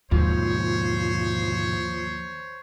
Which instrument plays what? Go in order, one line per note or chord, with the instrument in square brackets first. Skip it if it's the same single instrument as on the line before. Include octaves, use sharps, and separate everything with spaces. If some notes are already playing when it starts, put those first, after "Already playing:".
[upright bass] D#2 [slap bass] G#2 B2 D3 [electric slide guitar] F3 [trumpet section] C5 C#5